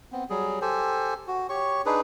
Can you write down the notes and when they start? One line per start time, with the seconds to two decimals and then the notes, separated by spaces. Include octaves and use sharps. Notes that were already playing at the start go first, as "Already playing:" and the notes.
0.12 B3 C4
0.30 F#3 G3 G#4
0.62 G4 A4 C5 G#5
1.27 F#4
1.49 G4 C#5 C#6
1.86 D4 D#4 G#4 B4